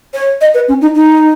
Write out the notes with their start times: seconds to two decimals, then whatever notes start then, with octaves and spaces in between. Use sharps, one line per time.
0.14 C#5
0.41 D#5
0.54 B4
0.68 C#4
0.81 D#4
0.95 D#4